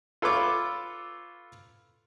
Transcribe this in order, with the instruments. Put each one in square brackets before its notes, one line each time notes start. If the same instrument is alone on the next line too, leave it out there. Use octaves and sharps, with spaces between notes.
[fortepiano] F4 A4 B4 C#5 D6